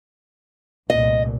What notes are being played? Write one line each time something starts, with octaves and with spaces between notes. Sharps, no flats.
F1 C2 A#2 D#5